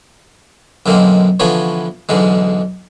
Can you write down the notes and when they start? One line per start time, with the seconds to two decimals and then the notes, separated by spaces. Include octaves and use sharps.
0.86 F#2 B2 D3 G#3 A#3 C4
1.40 D3 E3 F3 B3 C#5
2.09 B1 E2 G#2 D3 G#3